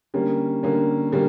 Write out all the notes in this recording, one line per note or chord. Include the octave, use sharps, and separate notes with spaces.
D3 G3 A#3 C#4
D3 G3 A#3 C#4
D3 G3 A#3 C#4